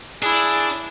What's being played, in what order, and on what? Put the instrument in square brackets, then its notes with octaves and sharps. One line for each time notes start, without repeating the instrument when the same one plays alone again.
[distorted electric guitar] D4 [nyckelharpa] E4 [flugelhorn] G#4